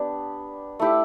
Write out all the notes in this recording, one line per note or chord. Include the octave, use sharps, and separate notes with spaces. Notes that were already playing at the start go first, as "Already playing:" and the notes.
Already playing: B3 D4 G4
A3 E4 G4